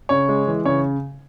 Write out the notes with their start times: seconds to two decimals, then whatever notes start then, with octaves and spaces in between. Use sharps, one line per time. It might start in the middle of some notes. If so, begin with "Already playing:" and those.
0.09 C#3 C#5
0.29 G#3
0.48 E3
0.65 C#3 C#5